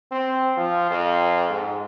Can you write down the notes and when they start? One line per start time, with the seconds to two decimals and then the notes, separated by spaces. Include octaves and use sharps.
0.12 C4
0.57 F3
0.90 F2
1.50 G#2